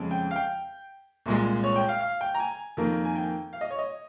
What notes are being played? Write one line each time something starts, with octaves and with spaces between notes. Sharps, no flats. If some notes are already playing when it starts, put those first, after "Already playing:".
Already playing: F2 C#3 G#3
G5
F5
G5
C2 A#2 G#3
C#5
G5
F5
F5
G5
A#5
G#5
F2 D#3 A#3
G#5
G5
F5
D#5
C#5
D#5